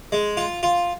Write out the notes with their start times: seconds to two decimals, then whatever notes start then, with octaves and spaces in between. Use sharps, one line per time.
0.12 G#3
0.37 F4
0.63 F4